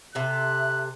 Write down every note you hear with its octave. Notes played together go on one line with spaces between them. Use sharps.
C3 A4 E5 F#6